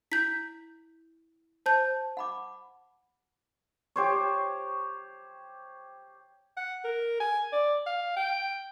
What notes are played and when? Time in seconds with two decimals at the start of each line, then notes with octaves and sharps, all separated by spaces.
0.12 E4 G6 B6
1.66 C5 A5 G6
2.17 F#5 B5 D6
3.96 G4 C5 C#5
6.57 F#5
6.84 A#4
7.20 G#5
7.53 D5
7.86 F5
8.17 G5